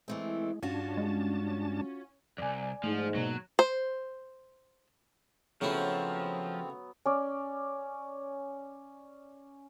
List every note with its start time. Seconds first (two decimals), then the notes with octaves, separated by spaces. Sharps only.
0.08 E3 G#3 A3 C4
0.63 G2 C#4 D4 F4 F#4 A5
0.97 G#3
2.38 C2 F2 D5 G#5
2.84 G#2 F3 A3
3.15 B2 F#3 A#3 B3
3.59 C5
5.61 C#3 F3 F#3 A3 B3 C4 E4
7.06 C#4 D5